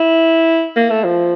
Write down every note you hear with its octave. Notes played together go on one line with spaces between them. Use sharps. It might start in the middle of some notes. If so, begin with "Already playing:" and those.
Already playing: E4
A#3
A3
F3